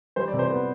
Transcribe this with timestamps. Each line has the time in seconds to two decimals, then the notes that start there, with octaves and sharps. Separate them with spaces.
0.16 G3 C5
0.28 D5
0.33 C3
0.39 C5
0.50 B3 B4